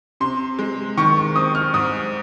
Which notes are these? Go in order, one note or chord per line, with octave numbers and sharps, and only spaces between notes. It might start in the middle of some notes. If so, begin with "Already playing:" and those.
C3 C6
G#3
D#3 C#6
C4 D#6
F6
G#2 D#6